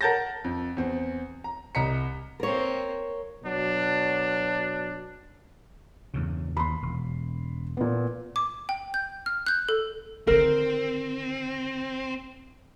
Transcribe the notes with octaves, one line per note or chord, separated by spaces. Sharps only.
A#4 F#5 A5 G6 A6 A#6
F2
E2 C4
A#5
C2 D#5 A#5 B6 C#7
A#3 C4 A#4 C#5
B2 F#3 D4
E2 G2 C#3
D#2 B5 C6
E1
A#2 B3
D6
G5
G6
F6
F#6 G6
A4
D3 D#3 C4 A#4